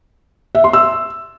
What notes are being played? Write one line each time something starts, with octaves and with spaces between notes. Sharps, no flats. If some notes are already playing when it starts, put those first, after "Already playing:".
E5
C6
E6